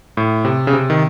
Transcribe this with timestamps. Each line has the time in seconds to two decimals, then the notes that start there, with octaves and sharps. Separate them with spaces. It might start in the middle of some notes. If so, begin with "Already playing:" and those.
0.17 A2
0.45 C3
0.67 C#3
0.73 C3
0.90 D#3